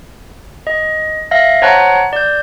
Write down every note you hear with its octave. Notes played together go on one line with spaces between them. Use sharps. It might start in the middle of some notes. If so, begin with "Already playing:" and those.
D#5
E5 F5 A#6
C5 C#5 F#5 A5 A#5 F#6
D5 G6